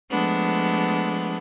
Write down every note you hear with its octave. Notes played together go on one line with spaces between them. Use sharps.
F3 G#3 A3 B3 D4